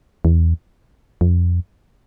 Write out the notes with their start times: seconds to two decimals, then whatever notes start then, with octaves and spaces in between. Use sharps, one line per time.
0.25 E2
1.21 F2